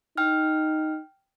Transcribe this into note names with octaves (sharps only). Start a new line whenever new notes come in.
D#4 G5 F6